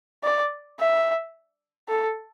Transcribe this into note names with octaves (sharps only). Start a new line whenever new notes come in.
D5
E5
A4